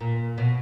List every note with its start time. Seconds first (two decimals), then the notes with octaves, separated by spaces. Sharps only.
0.01 A#2
0.38 B2